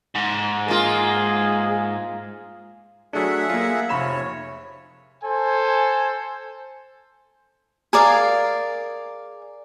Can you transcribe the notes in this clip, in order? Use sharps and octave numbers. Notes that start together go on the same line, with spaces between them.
G#2
A#3 F4 G#4
F#3 A3 D4 G#4 E5 F#5
A#3 F4 F5
F1 C#5 B5 E7
A4 C5 G#5
G#4 A#4 D5 F5